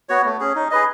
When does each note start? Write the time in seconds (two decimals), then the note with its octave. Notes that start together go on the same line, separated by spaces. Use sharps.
0.09 B3 F#4 C#5
0.25 A3
0.40 C#4 G#4
0.56 D#4
0.71 G#4 B4 D#5